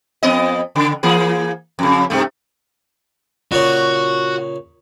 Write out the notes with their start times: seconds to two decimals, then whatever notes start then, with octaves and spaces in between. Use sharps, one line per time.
0.23 F2 B3 D#5
0.76 C#3
1.03 E3 A#3 G#4
1.79 F2 C#3
2.10 G2 C3 A3
3.52 A#2 C#3 F#4